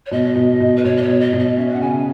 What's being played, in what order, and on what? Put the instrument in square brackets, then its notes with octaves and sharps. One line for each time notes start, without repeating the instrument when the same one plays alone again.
[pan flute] C#5
[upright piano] B2 [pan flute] D#5
[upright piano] B2
B2
[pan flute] B4
[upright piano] B2 [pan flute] C#5
[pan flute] D#5
C#5
[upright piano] B2
[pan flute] D#5
[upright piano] B2
[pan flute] D#5
[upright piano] C#4 [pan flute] E5
[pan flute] F#5
[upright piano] C#3 [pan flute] G#5